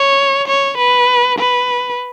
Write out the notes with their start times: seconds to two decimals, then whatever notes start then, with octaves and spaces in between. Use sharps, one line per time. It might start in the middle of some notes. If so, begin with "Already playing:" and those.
Already playing: C#5
0.48 C#5
0.78 B4
1.39 B4